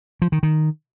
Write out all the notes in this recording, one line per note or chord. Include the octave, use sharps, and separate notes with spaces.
F3
D#3
D#3